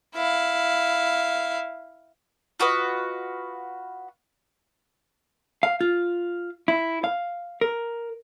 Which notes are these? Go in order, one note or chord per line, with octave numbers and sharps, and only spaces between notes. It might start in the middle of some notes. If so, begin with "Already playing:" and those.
E4 F5
F4 F#4 B4 D#5
F5
F4
E4
F5
A#4